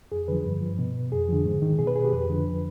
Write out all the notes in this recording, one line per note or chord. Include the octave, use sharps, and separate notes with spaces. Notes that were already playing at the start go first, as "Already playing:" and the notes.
F2 G#4
D3 F3 B4
G2
F3
B2
F2 G#4
D3 F3
G#2
D#3
B2 G#4
B4
G#4
G4
F2 B4
D3 F3